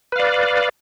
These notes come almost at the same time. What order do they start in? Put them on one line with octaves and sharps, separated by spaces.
B4 F5 D5